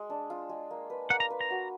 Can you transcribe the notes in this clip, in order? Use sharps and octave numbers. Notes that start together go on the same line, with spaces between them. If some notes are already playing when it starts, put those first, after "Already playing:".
Already playing: G#3
D4
F4
G#3
A#3
B4
A#3 F#5
A#5
B4
A#5
F#4